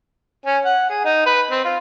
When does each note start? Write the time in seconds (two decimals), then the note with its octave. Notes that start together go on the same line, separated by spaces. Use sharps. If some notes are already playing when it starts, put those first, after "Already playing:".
0.46 C#4
0.65 F#5
0.89 G#4
1.04 D#4
1.26 B4
1.50 C4
1.64 F4